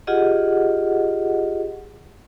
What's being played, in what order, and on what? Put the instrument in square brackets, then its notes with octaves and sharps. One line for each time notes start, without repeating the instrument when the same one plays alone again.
[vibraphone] F4 G4 G#4 D#5 F#5